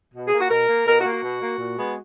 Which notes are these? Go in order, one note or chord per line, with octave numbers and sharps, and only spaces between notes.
B2
G#4
A#3
F#4
B2 A#4
A#3
B2 A#4
F#4
A#3
F#4
B2
A#3
A#2
G#3 B3